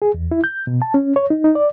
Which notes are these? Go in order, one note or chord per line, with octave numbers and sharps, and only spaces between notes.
G#4
E2
E4
G6
B2
A5
C#4
C#5
D#4
D#4
D5